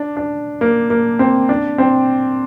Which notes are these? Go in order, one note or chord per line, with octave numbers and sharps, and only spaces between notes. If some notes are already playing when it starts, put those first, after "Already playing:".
Already playing: D4
D4
A#3
A#3
C4
D4
C4